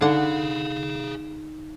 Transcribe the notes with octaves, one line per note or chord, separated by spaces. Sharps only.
D3 D#4 G#4 F5 F#5